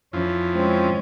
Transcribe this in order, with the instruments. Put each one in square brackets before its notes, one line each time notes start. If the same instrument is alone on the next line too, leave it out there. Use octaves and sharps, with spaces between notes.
[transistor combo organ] F2 E3 F3 [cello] C#4
[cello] G#3 C#4 [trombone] C4